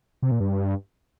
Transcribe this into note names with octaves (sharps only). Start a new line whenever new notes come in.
C3
A#2
G2